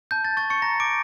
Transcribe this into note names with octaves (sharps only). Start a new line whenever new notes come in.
A5 G6
A6
C#6 G6 A6
C#6 C#7
A#5 C#6 A#6
D6 D7